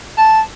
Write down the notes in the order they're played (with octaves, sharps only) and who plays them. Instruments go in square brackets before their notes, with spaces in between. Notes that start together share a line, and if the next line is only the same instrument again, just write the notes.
[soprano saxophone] A5